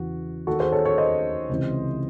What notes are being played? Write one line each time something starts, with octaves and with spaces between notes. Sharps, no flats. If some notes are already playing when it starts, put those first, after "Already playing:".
Already playing: E2 C#3 E3 F#4
D#2 D#3 F#4 A4
G#4 C5
A4 C#5
A4 C#5
C5 D#5
C#2 C3 E3